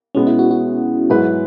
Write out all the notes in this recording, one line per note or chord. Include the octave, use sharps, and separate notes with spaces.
B2 G#3 B3 C#4
E4
F#4
F#4
G#2 F#3 E4 G#4 B4